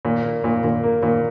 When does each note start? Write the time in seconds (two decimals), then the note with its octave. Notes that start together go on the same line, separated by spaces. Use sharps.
0.05 A#2
0.24 A#3
0.44 A#2
0.64 A#2
0.83 A#3
1.03 A#2